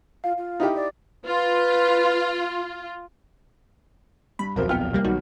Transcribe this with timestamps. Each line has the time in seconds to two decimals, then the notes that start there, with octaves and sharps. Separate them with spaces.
0.24 F4 F5
0.37 F4
0.60 D#4 E4 G4
0.75 D5
1.25 F4 B4
4.39 G2 B5
4.56 D#1 B1 F2 F#4 A#4 C5
4.69 B3 F4 G5 F6
4.93 C2 G3 A#3
5.04 B1 B2 D#3 G3 D#4 F#4